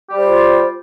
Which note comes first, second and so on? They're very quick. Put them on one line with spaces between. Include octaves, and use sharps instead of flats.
G4 G3 C5 F4